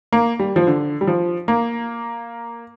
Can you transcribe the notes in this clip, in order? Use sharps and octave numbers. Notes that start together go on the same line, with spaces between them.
A#3
G3
F3
D3
G3
F3
A#3